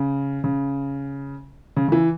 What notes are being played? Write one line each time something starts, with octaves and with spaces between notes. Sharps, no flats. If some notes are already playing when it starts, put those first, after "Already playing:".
Already playing: C#3
C#3
C#3
C#3
E3